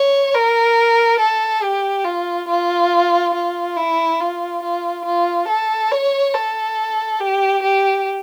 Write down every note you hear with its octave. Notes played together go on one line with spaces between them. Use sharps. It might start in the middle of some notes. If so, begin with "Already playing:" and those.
Already playing: C#5
A#4
A4
G4
F4
F4
F4
E4
F4
F4
F4
A4
C#5
A4
G4
G4